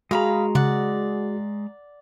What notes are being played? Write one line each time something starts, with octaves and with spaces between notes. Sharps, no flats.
G#3 F#4 G#4 F5 A#5 B5
C#3 D5 F#5